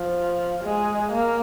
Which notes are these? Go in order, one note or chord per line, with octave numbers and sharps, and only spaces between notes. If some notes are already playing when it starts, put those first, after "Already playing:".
Already playing: F3
G#3
A#3